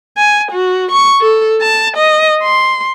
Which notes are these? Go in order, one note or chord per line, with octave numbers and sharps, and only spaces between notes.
G#5
F#4
C#6
A4
A5
D#5
C6